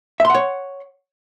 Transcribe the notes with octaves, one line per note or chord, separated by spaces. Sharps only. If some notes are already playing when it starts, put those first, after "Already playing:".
C#5 E5 F#5 C6